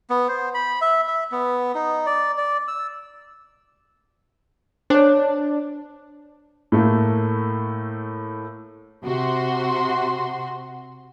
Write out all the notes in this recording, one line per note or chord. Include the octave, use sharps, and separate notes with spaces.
B3
C5
B5
E5
E5
B3
D#4
D5
D5
E6
D4 C5 C#5
A2 A3 A#3
C3 F#4 C6